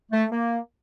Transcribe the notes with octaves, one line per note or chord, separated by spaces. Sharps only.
A3
A#3